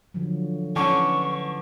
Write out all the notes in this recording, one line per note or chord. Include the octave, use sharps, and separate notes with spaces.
D3 F3 F#3
D3 E3 C#4 C#6